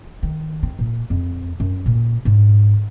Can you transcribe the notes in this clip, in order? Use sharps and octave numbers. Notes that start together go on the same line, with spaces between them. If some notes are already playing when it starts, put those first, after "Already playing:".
D#3
C4
A#2
F2
F#2
A#2
G#2